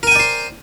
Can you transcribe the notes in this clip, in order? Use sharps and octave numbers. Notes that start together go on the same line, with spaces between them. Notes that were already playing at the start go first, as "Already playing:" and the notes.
A#4 C5 D5 G5 G#5